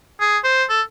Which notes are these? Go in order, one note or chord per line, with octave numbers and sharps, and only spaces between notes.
G#4
C5
A4